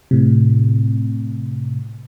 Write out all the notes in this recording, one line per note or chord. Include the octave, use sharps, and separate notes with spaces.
A2 C3